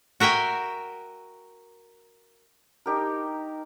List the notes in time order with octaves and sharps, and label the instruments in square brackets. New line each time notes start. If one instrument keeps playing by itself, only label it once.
[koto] F#4 A#4 E5 G5 G#5
[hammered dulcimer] D#4 G4 A#4